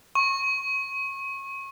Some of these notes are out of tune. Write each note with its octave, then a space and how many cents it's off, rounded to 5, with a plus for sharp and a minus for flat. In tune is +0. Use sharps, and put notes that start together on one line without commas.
C#6 -30